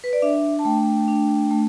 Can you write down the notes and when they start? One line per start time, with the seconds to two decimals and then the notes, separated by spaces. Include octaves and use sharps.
0.04 B4
0.13 D5
0.22 D4 E5
0.59 A5
0.65 A3 G5
1.08 D4
1.51 A3